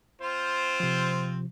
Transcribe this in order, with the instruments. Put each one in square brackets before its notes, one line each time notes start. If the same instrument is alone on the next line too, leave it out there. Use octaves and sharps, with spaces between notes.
[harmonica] C4 F4 [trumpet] C5
[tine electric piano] C3 F3